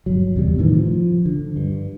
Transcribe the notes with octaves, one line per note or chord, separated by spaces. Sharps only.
G1 F#3
E2 C3 G3
A2 D#3 E3
F3
D3
G2